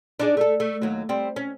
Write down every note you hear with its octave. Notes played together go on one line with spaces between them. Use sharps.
D4 D#4 G#4
A3 A4
A3
D#2 F#3
G3 C4
C#4